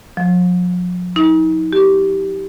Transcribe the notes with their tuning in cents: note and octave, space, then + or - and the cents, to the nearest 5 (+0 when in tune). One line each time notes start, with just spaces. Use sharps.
F3 +45
D#4 +40
G4 -10